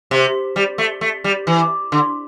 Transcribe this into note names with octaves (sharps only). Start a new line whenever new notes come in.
C3
G3
A3
A3
G3
E3
D3